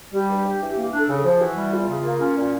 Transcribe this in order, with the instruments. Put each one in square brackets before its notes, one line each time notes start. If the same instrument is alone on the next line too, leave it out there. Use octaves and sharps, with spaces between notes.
[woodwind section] G3 [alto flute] G4
[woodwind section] G2
G2
E3
A#3
D4
[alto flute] A4
[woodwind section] C#3
[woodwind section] F3 [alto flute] G#4
[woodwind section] E3 [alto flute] F#4
[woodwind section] G3
[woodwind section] E2 [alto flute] F4
[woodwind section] C#3
A#3
C#4
A#2